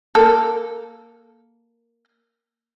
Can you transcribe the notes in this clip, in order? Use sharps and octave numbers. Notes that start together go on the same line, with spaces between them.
A#3 A4